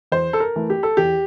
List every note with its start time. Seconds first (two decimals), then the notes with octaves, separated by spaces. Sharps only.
0.12 E2 C5
0.33 A4
0.40 A#4
0.56 E3 A3
0.70 G4
0.83 A4
0.97 E2 G4